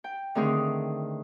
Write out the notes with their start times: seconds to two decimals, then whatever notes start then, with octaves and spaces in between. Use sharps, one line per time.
0.04 G5
0.35 D3 D#3 A3 C4 G#4 A#4